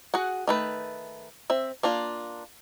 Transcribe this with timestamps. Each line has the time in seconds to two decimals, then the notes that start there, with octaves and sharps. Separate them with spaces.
0.14 F#4 G#4 F#5
0.47 D#3 A3 B4
1.50 C4 E5
1.83 A#3 D4 F4